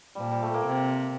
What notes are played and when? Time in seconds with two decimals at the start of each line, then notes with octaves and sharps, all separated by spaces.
0.15 A#2 F3 G3
0.31 G3
0.42 A3
0.54 A#3
0.66 C3 C4